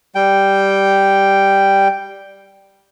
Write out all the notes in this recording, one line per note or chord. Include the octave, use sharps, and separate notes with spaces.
G3 G5